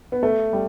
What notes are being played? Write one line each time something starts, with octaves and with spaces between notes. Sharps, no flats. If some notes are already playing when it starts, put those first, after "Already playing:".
B3
A3
G3